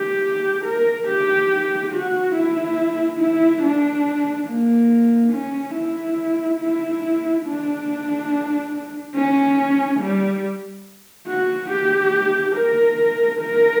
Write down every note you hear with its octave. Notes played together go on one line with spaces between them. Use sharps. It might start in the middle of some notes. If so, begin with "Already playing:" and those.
Already playing: G4
A#4
G4
F#4
E4
E4
D4
A#3
C#4
E4
E4
D4
C#4
G3
F#4
G4
A#4
A#4